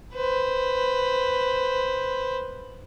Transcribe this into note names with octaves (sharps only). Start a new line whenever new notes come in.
B4 C5